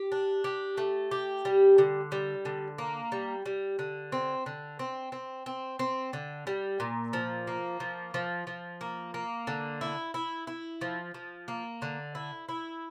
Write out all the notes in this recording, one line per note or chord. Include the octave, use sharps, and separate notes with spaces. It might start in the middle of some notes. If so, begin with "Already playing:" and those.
Already playing: G4
D4
G4
A3
G4
G3
D3
G3
D3
A#3
G3
G3
D3
C4
D3
C4
C4
C4
C4
D3
G3
A#2
F3
A#3
F3
F3
F3
A#3
A#3
D3
E4
E4
E4
F3
F3
A#3
D3
E4
E4